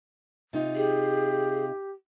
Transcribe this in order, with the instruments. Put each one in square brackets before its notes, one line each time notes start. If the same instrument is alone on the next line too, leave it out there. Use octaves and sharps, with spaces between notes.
[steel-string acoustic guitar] C3 D#4 F4
[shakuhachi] G4 [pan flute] G#4